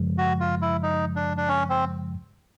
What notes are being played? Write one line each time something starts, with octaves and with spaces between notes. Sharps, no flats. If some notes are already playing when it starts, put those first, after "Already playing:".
Already playing: F#2 C#3 F3 G#3
F#4
F4
E4
D#4
D4
D4
C#4
C4